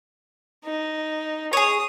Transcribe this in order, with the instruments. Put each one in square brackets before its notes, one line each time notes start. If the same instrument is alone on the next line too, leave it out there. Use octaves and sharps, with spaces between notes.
[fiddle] D#4
[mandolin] G#4 C#5 [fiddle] D#6